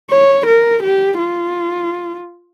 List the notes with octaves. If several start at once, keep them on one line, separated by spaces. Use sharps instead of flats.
C#5
A#4
G4
F4